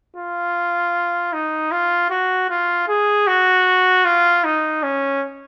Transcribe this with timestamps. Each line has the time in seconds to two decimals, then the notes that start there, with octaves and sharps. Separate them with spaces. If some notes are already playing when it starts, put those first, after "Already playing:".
0.16 F4
1.33 D#4
1.72 F4
2.11 F#4
2.50 F4
2.88 G#4
3.27 F#4
4.05 F4
4.44 D#4
4.83 C#4